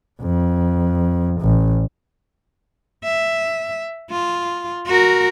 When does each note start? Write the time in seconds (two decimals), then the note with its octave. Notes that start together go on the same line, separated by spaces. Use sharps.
0.22 F2
1.40 A1
3.04 E5
4.11 F4
4.87 F#4 A#4